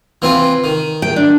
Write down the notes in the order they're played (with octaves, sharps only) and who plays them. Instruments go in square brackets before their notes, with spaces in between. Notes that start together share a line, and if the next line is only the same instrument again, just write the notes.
[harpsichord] E3 C4 F4
D#3
[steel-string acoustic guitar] G5
D4